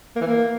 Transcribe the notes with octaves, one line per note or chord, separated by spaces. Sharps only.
A#3
E3
A#3